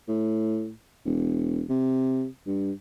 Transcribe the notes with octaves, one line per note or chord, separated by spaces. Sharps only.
A2
E1
C3
G2